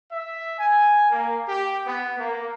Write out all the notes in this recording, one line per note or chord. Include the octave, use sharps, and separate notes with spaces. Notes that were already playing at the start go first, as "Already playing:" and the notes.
E5
G#5
A#3
G4
B3
A#3